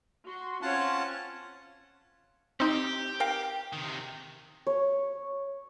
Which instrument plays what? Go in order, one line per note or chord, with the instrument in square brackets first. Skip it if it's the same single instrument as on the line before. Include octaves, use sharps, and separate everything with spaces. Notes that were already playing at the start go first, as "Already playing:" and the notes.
[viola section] F#4 C6
[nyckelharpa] C4 C#5 [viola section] C#4 [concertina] F4 F#5 A5
[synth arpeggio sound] C4 D#4 [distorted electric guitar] G4
[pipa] A#4 F5 G5
[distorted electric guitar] C3 D#3
[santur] C#5